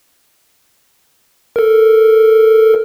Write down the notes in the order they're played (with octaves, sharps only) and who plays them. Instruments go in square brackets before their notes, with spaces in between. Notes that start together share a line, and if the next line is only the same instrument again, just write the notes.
[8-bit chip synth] A4 A#4